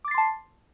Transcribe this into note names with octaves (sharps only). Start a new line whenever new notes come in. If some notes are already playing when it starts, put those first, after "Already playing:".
A5 C6 D6 A6 C7